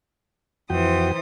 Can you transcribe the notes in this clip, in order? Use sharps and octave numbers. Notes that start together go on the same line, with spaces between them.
F2 E3 F#4 C5 G5 D#6